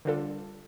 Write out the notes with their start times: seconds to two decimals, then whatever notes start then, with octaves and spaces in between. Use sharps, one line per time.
0.05 D3 G3 D4 F4 A4